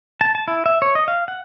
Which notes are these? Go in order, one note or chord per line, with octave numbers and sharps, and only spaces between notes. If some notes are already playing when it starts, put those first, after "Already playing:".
A5
A5
E4
E5
C#5
D#5
F5
F#5